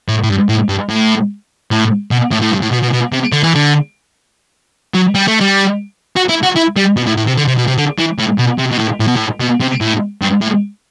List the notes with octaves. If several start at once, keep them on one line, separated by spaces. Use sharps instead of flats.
A2
A2
G2
A2
G2
A2
A2
B2
A2
A2
G2
A2
B2
B2
B2
C3
D3
E3
D3
F#3
G3
A3
G3
F#4
E4
F#4
E4
G3
B2
A2
A2
C3
D3
C3
B2
C3
D3
E3
A2
B2
C3
B2
A2
A2
B2
A2
B2
C3
A2
G2
A2